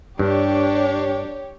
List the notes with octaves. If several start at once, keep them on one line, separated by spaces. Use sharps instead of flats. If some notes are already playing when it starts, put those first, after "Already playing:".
G2 D4 G4 C#5